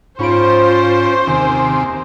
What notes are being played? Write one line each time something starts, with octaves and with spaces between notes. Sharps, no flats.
G#2 C#4 F4 C5 B5 D7
D#2 C3 D#3 G#5